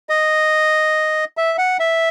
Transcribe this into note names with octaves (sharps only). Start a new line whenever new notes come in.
D#5
E5
F#5
E5